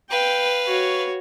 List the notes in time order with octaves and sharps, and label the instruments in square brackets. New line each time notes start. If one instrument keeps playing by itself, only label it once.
[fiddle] B4 F5 [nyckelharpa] G5
[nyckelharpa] F#4 C#5